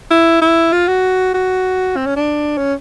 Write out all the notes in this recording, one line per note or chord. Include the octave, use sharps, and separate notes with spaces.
E4
E4
F4
F#4
F#4
C4
C#4
D4
C#4